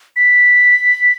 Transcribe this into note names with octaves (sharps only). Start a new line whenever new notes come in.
B6